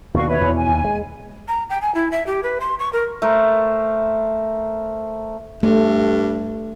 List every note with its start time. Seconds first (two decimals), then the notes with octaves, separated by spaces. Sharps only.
0.14 D#2 B2 D3 F#4 F5 C#6
0.28 B4 C#5 E5
0.41 E2 B2 E3
0.56 G#5
0.69 D#2
0.84 G#3
1.48 A#5
1.70 G5
1.82 G#5
1.94 E4
2.11 E5
2.27 G4
2.43 B4
2.60 C6
2.79 C#6
2.93 A#4
3.22 A3 A#4 C5
5.63 G2 A3